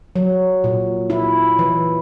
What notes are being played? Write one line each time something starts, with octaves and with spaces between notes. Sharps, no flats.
F#3
A#2
E4
E3